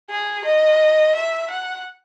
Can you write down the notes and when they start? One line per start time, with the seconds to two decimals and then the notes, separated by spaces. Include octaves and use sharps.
0.11 G#4
0.45 D#5
1.15 E5
1.50 F#5